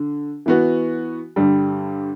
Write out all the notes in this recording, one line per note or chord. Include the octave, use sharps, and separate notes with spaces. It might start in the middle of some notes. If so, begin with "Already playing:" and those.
Already playing: D3
E3 B3 F#4
G2 D3 G3